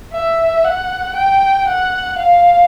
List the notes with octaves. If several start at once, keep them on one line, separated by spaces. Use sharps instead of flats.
E5
F#5
G5
F#5
F5